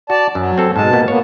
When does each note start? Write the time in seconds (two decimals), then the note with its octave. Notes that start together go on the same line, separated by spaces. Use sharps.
0.10 F#4 D5 A5
0.35 F#2 F#3
0.58 C4 A4
0.76 G#2 B2 G#3 A5
0.93 A#2 A#3 B3
1.08 A#3 B3 C#5